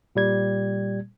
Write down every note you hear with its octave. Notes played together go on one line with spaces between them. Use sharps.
A#2 G3 G#6